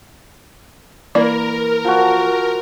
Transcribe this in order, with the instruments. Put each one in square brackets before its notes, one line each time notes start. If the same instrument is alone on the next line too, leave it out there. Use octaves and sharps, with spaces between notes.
[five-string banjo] E3 A#3 D5 [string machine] A#4
[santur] F3 F#4